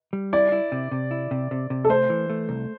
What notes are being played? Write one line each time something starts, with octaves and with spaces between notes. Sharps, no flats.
G3
E4 D5
E4
C3
C3
E4
C3
C3
C3
A4
A3 C5
E3
A3
C2